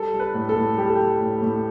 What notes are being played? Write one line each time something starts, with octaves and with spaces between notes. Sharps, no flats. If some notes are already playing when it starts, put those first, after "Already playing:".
Already playing: G3 A4
G3
B4
A2
A4
A2
G3 G4
A4
G3 G4
A2
A2